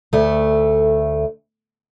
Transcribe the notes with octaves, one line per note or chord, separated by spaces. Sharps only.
D2 A3